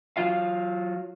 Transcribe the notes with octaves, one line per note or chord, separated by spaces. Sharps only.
F#3 F4 F5